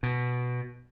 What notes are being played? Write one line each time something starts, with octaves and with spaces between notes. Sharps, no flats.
B2